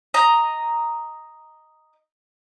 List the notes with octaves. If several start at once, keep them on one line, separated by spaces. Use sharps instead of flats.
D#5 A#5